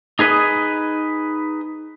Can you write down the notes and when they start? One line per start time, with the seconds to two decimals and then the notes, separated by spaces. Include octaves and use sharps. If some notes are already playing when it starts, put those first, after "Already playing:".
0.19 D#4 G#4 B4 D#5